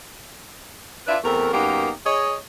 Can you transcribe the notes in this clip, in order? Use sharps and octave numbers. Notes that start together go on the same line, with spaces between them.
D4 F4 B4 D5 E5
E2 A3 C4 A#4
F#2 A#3 B3 D#4 G4
G#4 C#5 D#5